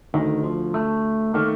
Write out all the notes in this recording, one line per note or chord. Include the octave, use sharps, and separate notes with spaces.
D2 D3 D#3 A3
F3
A3
D#3 A3 A#3 D#4